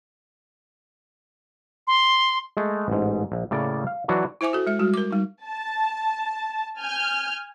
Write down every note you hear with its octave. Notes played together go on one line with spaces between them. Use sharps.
C6
G#3 A3
A1 G#2
A#1
A2 C#3 A#3 D5
F5
E3 F#3 D4 F#4
E4 C5 E5 G#5 D6
F#4 A4
G#3 E5
G3 G#3 F#4
A#4 D6
G3 D#4
A5
G#5 F6 G6